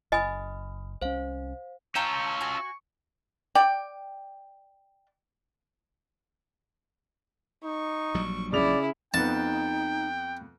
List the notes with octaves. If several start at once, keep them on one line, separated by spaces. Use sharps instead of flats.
F#1 D#5 G#5 B5 D#6 F6
C2 C#4 C5 F5
C#4 F4 F5 G5 A5 A#5 C#6 E6
F#4 G#5
D5 G5
D#4 C#6
A#1 F#3 G3
C#3 E4 D5 F7
F2 B3 D#4 G5 A5